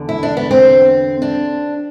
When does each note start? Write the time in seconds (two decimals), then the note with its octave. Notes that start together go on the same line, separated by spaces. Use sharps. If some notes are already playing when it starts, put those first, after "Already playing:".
Already playing: E2 D3
0.09 E4
0.23 D4
0.37 B3
0.51 C4
1.22 D4